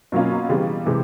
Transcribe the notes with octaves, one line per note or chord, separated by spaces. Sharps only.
B2 F#3 A#3 C#4 F4
C#3 E3 G3 B3
C3 E3 G#3